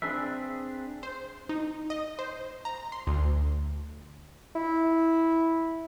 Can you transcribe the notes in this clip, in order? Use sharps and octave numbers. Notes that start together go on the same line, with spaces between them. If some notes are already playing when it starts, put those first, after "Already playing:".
C4 D4 G#4 B4 E5
C5
D#4
D#5
C5
A#5
C6
D2
E4